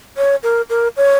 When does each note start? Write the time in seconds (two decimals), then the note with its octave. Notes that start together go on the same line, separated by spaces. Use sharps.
0.17 C#5
0.43 A#4
0.69 A#4
0.97 C#5